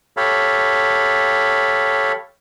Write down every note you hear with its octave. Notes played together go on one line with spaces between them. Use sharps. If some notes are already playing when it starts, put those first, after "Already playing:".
G4 A4 C#5 F5 B5